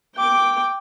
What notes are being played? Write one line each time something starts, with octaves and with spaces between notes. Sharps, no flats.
G5 D6